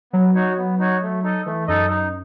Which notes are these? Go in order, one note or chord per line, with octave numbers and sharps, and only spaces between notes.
F#3 B3
D#4 F#4 C#5
B3
D#4 F#4 C#5
A3
D#4 A4 D#5
E3 A3
F#2 D#4 A4 D#5
D#4